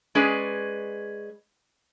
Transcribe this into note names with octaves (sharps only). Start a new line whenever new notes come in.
G#3 C#4 G#4 B4 D5